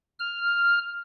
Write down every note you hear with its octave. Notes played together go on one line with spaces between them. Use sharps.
F6